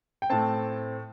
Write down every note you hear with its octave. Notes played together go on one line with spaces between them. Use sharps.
G5
A2 A3 C4 A5